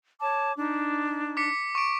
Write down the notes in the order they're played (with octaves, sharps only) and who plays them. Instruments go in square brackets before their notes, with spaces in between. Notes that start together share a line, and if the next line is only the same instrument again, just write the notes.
[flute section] C#5 A5 D6
D4 D#4
[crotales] D6 B6 C#7
C#6 D7